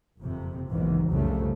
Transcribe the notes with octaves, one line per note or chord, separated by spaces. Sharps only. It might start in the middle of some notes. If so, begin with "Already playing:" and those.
F#1 F2 C3
F#1 B1 G#2 D#3 E3
C2 F#2 C#3 F3 A3